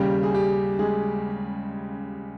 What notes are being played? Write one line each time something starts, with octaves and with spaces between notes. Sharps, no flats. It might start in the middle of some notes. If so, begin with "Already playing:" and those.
Already playing: D#2 C#3 G3 G4
G#4
G4
G#3 G#4